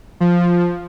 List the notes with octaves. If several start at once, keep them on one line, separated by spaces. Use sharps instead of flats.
F3